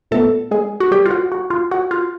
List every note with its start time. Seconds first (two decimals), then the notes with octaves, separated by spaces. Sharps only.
0.11 A#2 G3 A3 B3 A4
0.51 G#3 G#4
0.80 F#4
0.91 G3 G4
1.06 F4
1.11 F#4
1.32 F#4
1.50 F4
1.71 F#4
1.91 F4